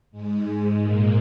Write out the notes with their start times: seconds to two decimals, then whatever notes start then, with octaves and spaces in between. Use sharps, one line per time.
0.12 G#2 G#3
0.46 G#2 G#3
0.82 A#2 A#3